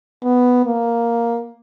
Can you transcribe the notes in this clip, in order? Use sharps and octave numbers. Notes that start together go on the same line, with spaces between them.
B3
A#3